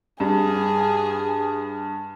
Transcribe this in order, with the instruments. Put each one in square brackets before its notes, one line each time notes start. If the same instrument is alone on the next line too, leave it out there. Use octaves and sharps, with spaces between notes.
[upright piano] G2 [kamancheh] G#4